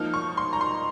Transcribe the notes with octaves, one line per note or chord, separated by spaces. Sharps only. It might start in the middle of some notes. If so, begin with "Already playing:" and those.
Already playing: F3 A#3 D#4 F6
C#6
C6
A#5
C6